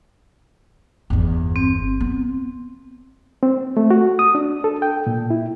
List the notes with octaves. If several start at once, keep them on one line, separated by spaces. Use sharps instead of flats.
G1 E2
C4
B3
C4
A3
F#4
D#6
D4
A4
G5
A#2
E4